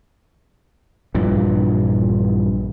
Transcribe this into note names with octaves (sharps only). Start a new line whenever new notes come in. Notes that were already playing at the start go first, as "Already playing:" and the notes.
A#1 G2 A#2 E3